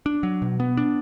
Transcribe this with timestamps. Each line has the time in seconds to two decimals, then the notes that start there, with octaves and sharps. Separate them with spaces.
0.06 D4
0.23 F#3
0.42 B2
0.60 B3
0.77 D4